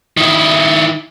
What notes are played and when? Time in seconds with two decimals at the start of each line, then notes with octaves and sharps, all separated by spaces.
0.17 D#3 E4